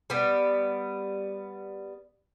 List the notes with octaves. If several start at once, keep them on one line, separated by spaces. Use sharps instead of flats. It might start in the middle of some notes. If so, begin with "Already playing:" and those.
G3 B3